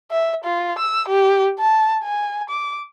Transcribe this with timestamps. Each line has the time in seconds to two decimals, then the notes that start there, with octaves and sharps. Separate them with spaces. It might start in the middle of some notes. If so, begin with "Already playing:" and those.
0.11 E5
0.45 F4
0.79 E6
1.09 G4
1.59 A5
2.04 G#5
2.50 D6